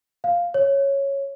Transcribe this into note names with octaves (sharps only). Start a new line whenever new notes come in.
F5
C#5